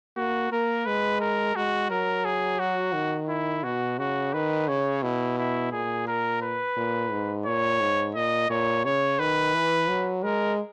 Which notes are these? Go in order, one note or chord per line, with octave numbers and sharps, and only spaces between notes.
A#3 F#4
A#3 A#4
G#3 B4
A#4
G#3 F#4
F#3 A#4
G#4
F#4
D#3
E4
B2 F#4
C#3 F#4
D#3 B4
C#3 C#5
B2 E4
E4
A#2 G#4
A#4
B4
A#2
G#2
A#2 C#5
G#2
A#2 D#5
A#2 C#5
C#3 C#5
D#3 B4
E3
F#3
G#3 A#4